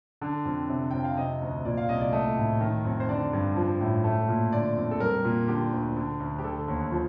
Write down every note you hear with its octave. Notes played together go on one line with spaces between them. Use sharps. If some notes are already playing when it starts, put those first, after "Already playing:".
D3
F2
C3
F2 G5
F5
C3 D#5
D2
A#2 D5
F5
C2 D#5
D5
A3 D#5
A2
D#3
F2
C5
D3 D5
G2
F3
A2
A3
A#2
D3 D5
F2
A4
G3 A#4
A#2
D3 G4
D2
D3
D2
G4
D3 A4
D#2
F3